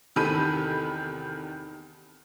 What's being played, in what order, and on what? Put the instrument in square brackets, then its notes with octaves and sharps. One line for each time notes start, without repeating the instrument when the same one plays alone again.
[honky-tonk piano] E2 C3 D#3 A4 B5 D#7